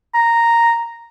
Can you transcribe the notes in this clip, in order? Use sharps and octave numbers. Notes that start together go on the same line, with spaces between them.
A#5